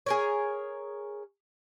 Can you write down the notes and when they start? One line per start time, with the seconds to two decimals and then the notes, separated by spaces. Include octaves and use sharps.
0.06 G#4 A#4 C#5